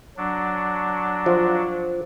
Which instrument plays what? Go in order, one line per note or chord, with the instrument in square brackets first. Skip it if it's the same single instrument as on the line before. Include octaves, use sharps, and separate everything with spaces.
[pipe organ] F#3 D4
[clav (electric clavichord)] F3